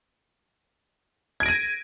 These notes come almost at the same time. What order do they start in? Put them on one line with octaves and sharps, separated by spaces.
G#6 D7 A#6 D#7